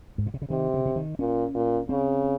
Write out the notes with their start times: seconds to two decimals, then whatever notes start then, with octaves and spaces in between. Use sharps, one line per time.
0.18 G#2
0.26 A#2
0.34 C3
0.42 C#3
0.50 C3 D#3
0.74 C#3
0.85 C#3
0.96 D#3
1.19 A#2 C#4
1.55 A#2
1.89 C#3 C4